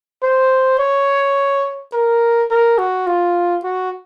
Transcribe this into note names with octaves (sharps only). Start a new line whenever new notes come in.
C5
C#5
A#4
A#4
F#4
F4
F#4